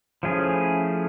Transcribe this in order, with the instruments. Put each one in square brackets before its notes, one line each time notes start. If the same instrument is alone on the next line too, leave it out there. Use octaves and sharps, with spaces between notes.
[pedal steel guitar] F3 A3 C#4 E4 G#4